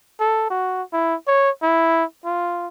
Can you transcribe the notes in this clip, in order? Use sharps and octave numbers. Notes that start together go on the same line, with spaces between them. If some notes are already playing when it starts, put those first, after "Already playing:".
A4
F#4
E4
C#5
E4
F4